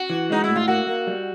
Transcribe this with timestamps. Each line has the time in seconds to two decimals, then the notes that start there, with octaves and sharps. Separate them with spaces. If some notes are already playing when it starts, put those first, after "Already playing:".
Already playing: F#4
0.10 E3
0.30 G#3 D#4
0.44 A2 E4
0.56 F4
0.68 A#3 F#4
0.87 A#3
1.07 G3